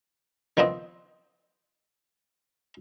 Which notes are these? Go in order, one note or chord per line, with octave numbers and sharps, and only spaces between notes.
D#3 F3 B3 C4 D#5